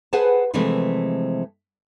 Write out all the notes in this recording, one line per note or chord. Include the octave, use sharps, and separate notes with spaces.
G#4 B4 C5 F#5 G#5 A5
C3 E3 F3 G#3 A3 C4